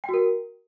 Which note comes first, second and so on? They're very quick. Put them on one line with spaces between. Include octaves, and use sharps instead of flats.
G5 F#4 A#4